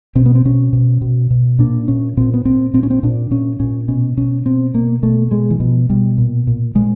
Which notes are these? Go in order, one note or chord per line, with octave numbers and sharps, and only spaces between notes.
B2 C4
B3
C4
B2 C#4
B2
B2
B2
A#2 D4
A#2 C#4
A#2 C4
B3
A#2 C4
A#2 C4
C#4
C4
A#2 D4
A#2 C#4
A#2 C#4
B2 C#4
B2 C#4
B2 C4
B2 A#3
B2 A3
B2 G#3
E3
B2 F3
B2 G3
A#2
A#2
A#2 G#3